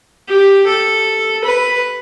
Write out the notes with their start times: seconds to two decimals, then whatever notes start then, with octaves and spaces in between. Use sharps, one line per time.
0.28 G4
0.66 A4
1.44 B4